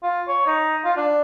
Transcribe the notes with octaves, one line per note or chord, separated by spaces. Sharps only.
F4
C#5
D#4
F4
D4